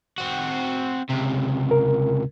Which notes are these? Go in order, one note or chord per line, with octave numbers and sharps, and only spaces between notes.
C4 F#4
C#2 C3
A#4